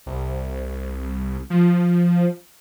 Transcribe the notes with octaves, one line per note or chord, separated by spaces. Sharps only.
C2
F3